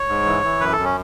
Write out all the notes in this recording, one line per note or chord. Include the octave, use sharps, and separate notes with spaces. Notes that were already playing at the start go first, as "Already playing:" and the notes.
Already playing: C#5
G#2
E3
E3
F#2 B4
A4
F#2
C#4